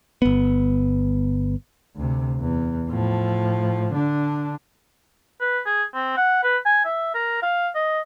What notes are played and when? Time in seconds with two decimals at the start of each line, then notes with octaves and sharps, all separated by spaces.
0.22 G1 B3
1.96 D2 C3
2.41 E2
2.90 A2 F3
3.93 D3 D4
5.41 B4
5.66 G#4
5.94 C4
6.17 F#5
6.43 B4
6.65 G#5
6.85 E5
7.14 A#4
7.42 F5
7.75 D#5